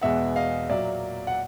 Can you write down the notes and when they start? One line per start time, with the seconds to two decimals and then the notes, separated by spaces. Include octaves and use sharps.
0.01 E2 B2 G#3 B3 E5 F#5
0.36 D#5 F5
0.69 A#2 F#3 A#3 D5 E5
1.27 F#5